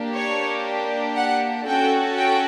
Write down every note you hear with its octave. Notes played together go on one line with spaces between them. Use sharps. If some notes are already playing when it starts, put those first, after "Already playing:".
Already playing: A#3 D4 G4
C#5
F#5
C#4 F#4 A4 G5
G5